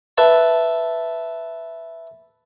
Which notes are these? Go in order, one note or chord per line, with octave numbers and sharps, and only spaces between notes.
B4 E5 A5